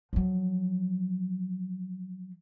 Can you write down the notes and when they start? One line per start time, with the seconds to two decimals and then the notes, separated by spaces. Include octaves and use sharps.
0.13 F3 F#3